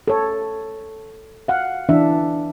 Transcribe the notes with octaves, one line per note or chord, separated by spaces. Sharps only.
A4 C#5
F5 F#5
E3 D4 E5